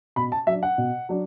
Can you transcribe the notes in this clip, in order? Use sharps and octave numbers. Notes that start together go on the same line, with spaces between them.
B2 B5
A5
F#3 D4 E5
F#5
B2
F#3 D4